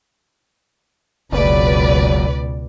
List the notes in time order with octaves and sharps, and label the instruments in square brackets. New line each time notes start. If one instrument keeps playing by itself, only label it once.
[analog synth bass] F#1 [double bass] C#2 B2 [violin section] B4 D5